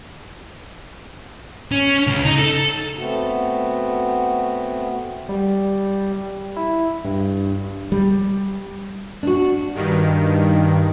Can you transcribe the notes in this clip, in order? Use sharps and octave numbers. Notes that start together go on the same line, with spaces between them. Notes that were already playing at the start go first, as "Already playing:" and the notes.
C#4
C#2
D#4
A4
A3 B3 C4 F#4
G3
E4
G2
G3
D4 F#4
G2 D#3